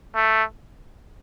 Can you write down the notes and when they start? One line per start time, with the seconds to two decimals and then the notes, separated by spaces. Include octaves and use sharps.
0.16 A3